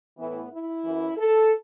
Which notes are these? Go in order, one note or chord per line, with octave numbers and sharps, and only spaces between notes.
A2 E3 B3
E4
F#2 E3
A4